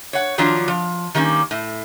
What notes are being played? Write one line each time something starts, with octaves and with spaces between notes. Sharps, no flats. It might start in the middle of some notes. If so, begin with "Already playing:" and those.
C#5 F#5
D#3 F3 F#3 D4 F4
F3
D#3 G3 A#3 C#4
A2